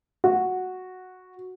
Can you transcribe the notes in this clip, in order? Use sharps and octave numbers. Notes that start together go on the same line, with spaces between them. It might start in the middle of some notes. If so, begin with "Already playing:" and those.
F#4